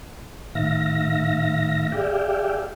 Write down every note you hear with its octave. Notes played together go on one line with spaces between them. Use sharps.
A2 D#3 E5 F5 A#6
G4 G#4 D5 E5 F5 G5